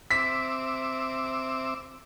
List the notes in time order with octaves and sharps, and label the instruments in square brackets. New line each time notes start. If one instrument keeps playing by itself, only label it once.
[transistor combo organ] C4 E5 D6 [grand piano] B6